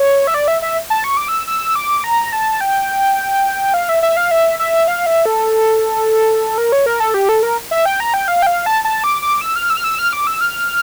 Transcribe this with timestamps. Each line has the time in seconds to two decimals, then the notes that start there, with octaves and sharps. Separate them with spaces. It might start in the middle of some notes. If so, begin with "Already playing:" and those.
Already playing: C#5
0.27 E5
0.34 D5
0.48 E5
0.62 E5
0.90 A5
1.04 C#6
1.17 D6
1.28 E6
1.47 E6
1.76 D6
2.04 A#5
2.33 A5
2.61 G5
3.74 F5
3.89 E5
4.03 E5
4.17 F5
4.31 E5
4.59 E5
4.88 F5
5.06 E5
5.26 A4
6.58 A#4
6.72 C#5
6.86 A#4
7.00 A4
7.14 G4
7.29 A4
7.43 A#4
7.71 E5
7.86 G5
8.00 A#5
8.14 G5
8.28 F5
8.42 G5
8.46 F5
8.66 A5
8.85 A5
9.04 D6
9.22 D6
9.41 E6
9.56 F6
9.70 E6
9.77 F6
9.84 E6
9.99 F6
10.13 D6
10.27 E6
10.41 F6